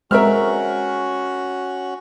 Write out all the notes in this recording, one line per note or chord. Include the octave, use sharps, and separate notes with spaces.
G#3 C4 C#4 F#4 A#4 E5 F6